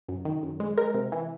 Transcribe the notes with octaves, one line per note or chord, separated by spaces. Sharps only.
F#2
D#3
F#2
G#3
G#3 A#4
C3
E3